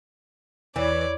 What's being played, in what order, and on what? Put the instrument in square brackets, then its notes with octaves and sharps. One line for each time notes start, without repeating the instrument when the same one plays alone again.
[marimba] E2 [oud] E3 [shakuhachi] C#5 [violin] D5